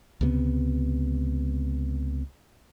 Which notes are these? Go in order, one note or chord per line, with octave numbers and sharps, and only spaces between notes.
C#2 C3 G#3 B3